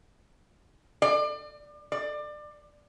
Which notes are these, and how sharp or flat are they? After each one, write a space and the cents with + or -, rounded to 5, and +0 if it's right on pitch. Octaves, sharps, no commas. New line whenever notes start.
D5 +35
D5 +25